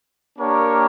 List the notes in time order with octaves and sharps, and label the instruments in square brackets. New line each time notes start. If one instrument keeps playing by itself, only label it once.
[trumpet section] A#3 D4 G4 A#4 C#5